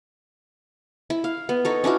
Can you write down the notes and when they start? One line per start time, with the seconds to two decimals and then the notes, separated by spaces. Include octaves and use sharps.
1.10 E4
1.24 F5
1.49 B3
1.65 D#4 A4 C#5
1.84 C#4 D4 E4 F#4